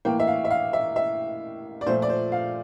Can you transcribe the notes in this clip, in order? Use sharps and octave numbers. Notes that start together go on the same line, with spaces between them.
A2 E3 A#3 G5
E5
F5
E5
F5
E5
E5
D5
A#2 F3 A3 C5
D5
C5
F5